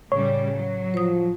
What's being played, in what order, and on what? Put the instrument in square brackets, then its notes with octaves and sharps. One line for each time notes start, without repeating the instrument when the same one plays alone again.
[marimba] A2 [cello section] C#3 G3 [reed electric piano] C#5
[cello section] F#3
[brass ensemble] F3 [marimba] C5 D#6